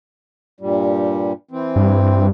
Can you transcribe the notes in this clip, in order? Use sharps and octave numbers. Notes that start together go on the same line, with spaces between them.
G2 A#2 G3
E3 C4
G2